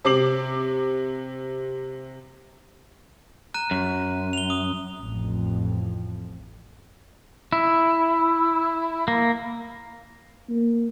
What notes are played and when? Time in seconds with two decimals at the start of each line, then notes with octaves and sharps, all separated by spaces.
0.05 C3 C4 D6 C7 F#7
3.54 A#5 F#6 D#7
3.71 F#2
4.33 F7 G7
4.50 D#6
4.99 A1 F2
7.53 E4
9.08 A#3
10.49 A#3